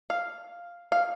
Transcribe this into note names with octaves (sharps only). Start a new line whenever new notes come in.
F5
F5